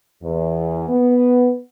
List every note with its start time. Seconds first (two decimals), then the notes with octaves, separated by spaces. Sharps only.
0.24 E2
0.89 B3